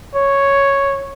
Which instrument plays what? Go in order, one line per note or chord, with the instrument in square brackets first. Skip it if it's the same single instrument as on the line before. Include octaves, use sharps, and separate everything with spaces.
[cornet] C#5